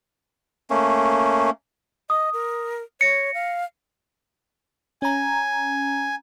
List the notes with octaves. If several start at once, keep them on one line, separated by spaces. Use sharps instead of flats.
A3 A#3 C#4
D#5 D#6
A#4
C#5 A#6 C#7
F5
C#4 G#5 A#5